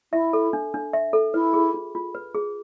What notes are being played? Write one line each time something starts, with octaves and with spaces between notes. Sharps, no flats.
E4 E5
A4
D4
D4
E5
A4
E4 B4
G#4
F4
F4
B4
G#4